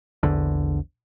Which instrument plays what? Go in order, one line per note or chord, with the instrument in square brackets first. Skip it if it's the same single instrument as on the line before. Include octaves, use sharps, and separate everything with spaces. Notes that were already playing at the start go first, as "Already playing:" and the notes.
[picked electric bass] A#1 E2 D3